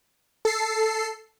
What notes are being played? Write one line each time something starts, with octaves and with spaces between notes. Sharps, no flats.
A4 C7